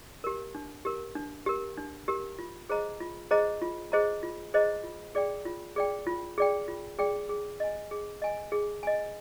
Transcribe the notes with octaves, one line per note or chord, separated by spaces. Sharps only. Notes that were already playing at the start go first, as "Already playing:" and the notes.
G4 A#4
D4
G4 A#4
D4
G4 A#4
D4
G4 A#4
F4
G#4 C5 D#5 A#5
F4
G#4 C5 D#5 A#5
F4
G#4 C5 D#5 A#5
F4
G#4 C5 D#5 A#5
F4
G#4 D5 G5
F4
G#4 D5 G5
F4
G#4 D5 G5
F4
G#4 D5 G5
G#4
D#5 G#5
G#4
D#5 G#5
G#4
D#5 G#5